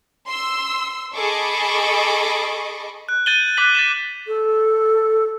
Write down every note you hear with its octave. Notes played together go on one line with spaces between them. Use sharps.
C6 E6
G#4 A4 D#5 B5 C#6 D6
F#6
G6 A6 D#7 F#7 G7
D6 F#6 A6 B6 F#7
A6 B6 E7
A4